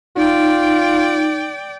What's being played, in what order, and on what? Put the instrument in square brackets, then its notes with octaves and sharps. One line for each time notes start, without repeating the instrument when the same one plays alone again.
[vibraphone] D#4 [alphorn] F4 [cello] D5 G5